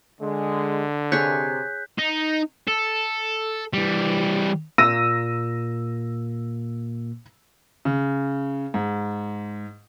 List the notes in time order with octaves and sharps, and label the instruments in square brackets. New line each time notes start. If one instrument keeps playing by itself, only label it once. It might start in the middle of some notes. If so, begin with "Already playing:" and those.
[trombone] D3 [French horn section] G#3
[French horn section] C3 [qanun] G#4 C#5 [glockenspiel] F#6 G6 B6
[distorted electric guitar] D#4
A4
E3 G3
[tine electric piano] A#2 A#3 [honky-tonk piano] E6 A#6 D#7
[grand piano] C#3
G#2